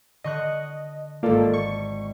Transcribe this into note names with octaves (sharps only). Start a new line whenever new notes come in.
D3 D#5 C#6 F#6
G#1 A#3 F4 A4 D5
C#6